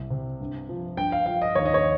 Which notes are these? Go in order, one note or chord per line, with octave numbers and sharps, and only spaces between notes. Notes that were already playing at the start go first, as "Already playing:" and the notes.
Already playing: C2
C3
G2
F3
G2 G5
F5
F3 F5
D#5
D#2 C#5
D#5
C#5